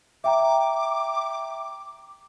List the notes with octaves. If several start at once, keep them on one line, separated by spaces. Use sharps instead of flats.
E5 G5 A#5 D6